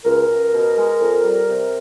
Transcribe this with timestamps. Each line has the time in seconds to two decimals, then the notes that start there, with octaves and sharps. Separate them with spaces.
0.05 C#2 A#4
0.29 C#2
0.54 B2
0.78 G#3
1.01 F2
1.25 G3
1.48 C3